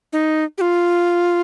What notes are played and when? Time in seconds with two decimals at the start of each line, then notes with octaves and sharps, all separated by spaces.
0.13 D#4
0.58 G4
0.61 F4